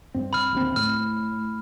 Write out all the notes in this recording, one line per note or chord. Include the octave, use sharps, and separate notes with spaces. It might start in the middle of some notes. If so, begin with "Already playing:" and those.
G2 C4
B5 F6
D1 D#2 C4
A2 F6